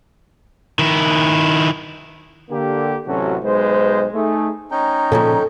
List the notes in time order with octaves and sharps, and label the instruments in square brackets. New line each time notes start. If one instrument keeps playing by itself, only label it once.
[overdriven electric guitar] D#3 E4
[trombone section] D3 A#3 G4
A1 C3 F#3 C#4 F#4 A4
B1 G#3 B4 C5
A3 D#4 G#4
[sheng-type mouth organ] C#4 D#4 G5 [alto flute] A#5
[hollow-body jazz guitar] A#2 C#3 F3 [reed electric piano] A4